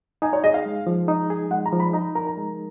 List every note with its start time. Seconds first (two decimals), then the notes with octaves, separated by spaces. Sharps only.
0.22 D#4 G#5
0.33 C#5
0.44 G#4 D#5
0.54 F5
0.66 G#3
0.87 F3
1.08 D#4
1.30 G#4
1.51 G#3 F#5
1.66 A#5
1.73 F3
1.80 B5
1.94 D#4 A#5
2.15 A#4 A#5
2.27 A#5
2.37 G#3